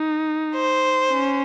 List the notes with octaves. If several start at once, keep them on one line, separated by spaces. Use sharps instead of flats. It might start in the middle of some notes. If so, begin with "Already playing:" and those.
Already playing: D#4
C5
C#4